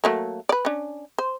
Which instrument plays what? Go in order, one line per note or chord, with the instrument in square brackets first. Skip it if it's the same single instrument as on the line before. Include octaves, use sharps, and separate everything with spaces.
[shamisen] F#3 A3 A#3
B4 D5
C#4 D4
C5